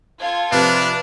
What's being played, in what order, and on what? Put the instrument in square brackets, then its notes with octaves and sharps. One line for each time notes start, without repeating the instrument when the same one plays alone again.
[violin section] F4 A4 G#6
[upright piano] C3 F3 [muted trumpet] D4 [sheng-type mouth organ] B4 F6